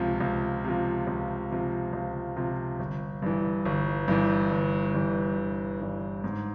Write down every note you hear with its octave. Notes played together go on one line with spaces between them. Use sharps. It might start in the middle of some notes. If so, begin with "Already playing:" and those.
Already playing: C#2 C3 F3
C#2
C3 F3
C#2
C3 F3
C#2
C3 F3
G1
G2 E3
G1
G2 E3
G1
G2 E3
G1
G2 E3
G#2